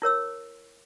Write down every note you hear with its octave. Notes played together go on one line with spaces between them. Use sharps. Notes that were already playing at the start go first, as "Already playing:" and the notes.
E4 A#4 C#5 E6